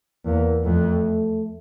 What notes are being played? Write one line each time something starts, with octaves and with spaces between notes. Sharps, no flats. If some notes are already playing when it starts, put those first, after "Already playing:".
E2 A#3
F2 A3